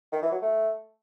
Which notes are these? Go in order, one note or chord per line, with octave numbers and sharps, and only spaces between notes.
D#3
E3
F#3
A3